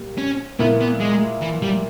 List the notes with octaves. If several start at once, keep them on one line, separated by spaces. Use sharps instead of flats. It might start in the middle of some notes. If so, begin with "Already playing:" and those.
Already playing: A#2 G3
C#4
A#2 A#3 B3 E4
B3
G#3
E3
G3